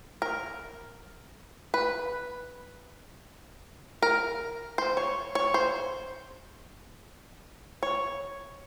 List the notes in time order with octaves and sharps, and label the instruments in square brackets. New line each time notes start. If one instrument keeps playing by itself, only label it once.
[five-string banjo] A#4
B4
A#4
C5
C#5
C#5
C5
C#5